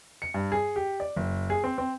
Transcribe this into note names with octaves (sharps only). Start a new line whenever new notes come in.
C#7
G2
G#4
G4
D5
F#1
G#4
C4
C4